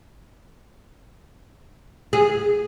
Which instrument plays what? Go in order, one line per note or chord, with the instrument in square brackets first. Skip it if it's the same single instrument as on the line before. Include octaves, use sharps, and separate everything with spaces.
[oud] G#4